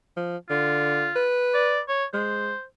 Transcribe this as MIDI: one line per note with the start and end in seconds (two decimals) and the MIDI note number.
0.16 0.37 53
0.50 1.10 50
0.50 1.24 65
1.16 1.85 71
1.54 1.80 74
1.88 2.05 73
2.13 2.53 56
2.13 2.64 72